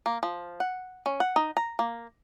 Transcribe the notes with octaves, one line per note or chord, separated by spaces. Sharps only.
A#3
F3
F#5
C#4
F#5
D#4
A#5
A#3